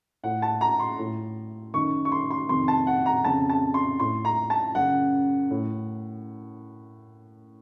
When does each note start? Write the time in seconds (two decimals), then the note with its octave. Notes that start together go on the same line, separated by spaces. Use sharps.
0.23 A2 F#5
0.42 A5
0.61 A#5
0.80 C6
0.98 A2
1.74 F#2 D#3 C#6
2.05 C#6
2.12 C6
2.31 C6
2.49 F2 C3 D#3 C6
2.68 A5
2.87 F#5
3.06 A#5
3.25 F2 C#3 A5
3.49 A5
3.74 C6
4.00 A2 C6
4.25 A#5
4.50 A5
4.75 F#2 C#3 F#5
5.50 A2